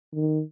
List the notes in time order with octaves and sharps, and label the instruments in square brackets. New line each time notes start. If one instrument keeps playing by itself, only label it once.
[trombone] D#3